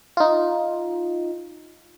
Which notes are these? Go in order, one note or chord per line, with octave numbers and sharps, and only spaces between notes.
D#4 F4